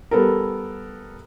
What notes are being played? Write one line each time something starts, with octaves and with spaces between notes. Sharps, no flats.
G3 B3 A4 A#4